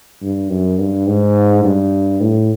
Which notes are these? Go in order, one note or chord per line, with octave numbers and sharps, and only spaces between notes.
G2
F#2
G2
G#2
G2
A2